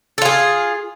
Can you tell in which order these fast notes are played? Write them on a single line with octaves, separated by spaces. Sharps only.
A4 F4 G#4